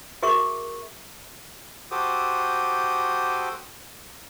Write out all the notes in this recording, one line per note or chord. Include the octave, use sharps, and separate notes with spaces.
F#4 G#4 A#4 E5 C#6
F#4 G4 A4 C5 D6 D#6